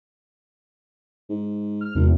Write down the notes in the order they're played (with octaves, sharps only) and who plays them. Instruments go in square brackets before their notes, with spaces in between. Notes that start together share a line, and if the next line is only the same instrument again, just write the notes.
[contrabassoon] G#2
[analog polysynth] F6
[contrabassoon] G#1 [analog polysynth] E2 C3